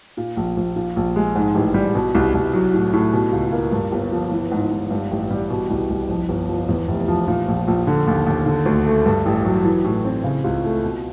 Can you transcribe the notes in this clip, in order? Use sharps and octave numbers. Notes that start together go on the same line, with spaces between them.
A#2
A#1
A#1
A#2
A#1
G#3
G#2
A1
G3
B2
C2
C2
F#3
A2
A2
B2
C#2
A#3
G2
G1
F3
E3
G#2
G#2
G2
A1
G3
B2
C2
C2
F2
G1
F3
E2
F1
F3
A#2
A#1
A#1
D3
D#2
D#2
D3
D2
A3
G2
A1
F#3
E3
A2
C4
C#3
C#2
A3
B2